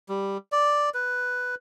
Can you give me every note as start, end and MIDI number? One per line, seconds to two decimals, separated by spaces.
0.09 0.37 55
0.52 0.90 74
0.94 1.55 71